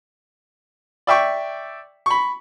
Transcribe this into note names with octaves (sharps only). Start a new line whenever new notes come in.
D5 E5 G5 C#6
B5 C#6